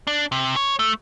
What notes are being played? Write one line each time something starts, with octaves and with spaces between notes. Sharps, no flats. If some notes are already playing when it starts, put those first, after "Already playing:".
D4
C3
C#5
A3